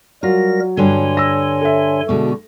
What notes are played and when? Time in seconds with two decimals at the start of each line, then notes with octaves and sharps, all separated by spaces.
0.23 F#3 G3 F4 A#4 A#6
0.77 G2 D3 C#5 G#5 C6
1.17 E6 A#6
1.61 A4 E5
2.09 B2 D3 G#3 F#4